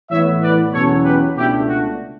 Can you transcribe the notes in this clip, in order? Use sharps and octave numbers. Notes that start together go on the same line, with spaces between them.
A2 E3 B3 C#5 E5
B4 D5
E2 B2 F#3 C#4 A4 C#5
G4 B4
C#2 B2 A3 D4 E4 G4
F#4